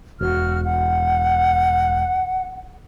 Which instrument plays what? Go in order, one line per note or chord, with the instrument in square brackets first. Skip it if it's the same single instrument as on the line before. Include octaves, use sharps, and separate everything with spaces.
[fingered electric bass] E1 [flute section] F#4 F6
[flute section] F#5